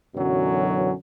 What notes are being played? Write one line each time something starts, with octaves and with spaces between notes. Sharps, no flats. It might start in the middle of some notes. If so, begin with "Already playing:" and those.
F#2 B2 D3 E3 F#3 C#4